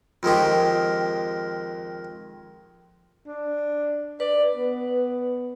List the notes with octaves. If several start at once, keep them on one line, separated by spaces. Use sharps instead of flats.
F2 D#3 G#3 G4
D4
B4 D5
B3